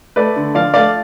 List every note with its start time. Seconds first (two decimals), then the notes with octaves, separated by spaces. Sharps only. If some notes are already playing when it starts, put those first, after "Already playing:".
0.16 A3 B4 D5
0.36 D3
0.55 F3 D5 F5
0.74 A3 D5 F5